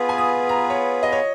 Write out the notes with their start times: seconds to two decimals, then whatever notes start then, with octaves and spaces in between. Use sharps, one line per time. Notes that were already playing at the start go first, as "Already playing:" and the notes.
Already playing: B3 F4 G#4 B4
0.09 G#5
0.18 D#6
0.49 A#5
0.70 C#5
1.03 D#5
1.12 C#5